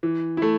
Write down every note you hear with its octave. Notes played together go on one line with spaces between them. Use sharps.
E3
A3 E4